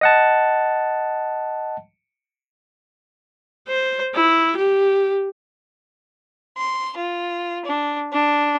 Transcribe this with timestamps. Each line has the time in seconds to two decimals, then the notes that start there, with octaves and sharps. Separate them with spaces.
0.01 D#5 F#5 A5
3.68 C5
4.15 E4
4.57 G4
6.58 C6
6.97 F4
7.65 D4
8.12 D4